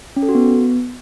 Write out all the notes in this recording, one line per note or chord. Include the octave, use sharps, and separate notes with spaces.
C#4
A4
F#4
B3